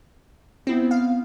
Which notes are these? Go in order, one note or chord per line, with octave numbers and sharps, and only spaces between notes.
B3 C4 E4
F5